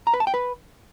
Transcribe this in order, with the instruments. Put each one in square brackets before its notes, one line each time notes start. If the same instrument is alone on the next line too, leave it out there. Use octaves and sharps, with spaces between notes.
[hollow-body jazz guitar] A#5
B4
A5
G5
B4